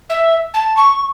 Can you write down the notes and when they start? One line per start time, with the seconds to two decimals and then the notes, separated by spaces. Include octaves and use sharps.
0.09 E5
0.54 A5
0.77 C#6